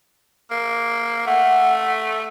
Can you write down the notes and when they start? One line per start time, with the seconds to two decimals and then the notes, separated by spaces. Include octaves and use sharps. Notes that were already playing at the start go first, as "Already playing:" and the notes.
0.51 A#3
1.26 A3 F#5